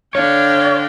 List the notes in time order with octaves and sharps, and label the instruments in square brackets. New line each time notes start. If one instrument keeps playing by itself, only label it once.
[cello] D3 D4 [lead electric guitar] C#5 [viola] F5 G5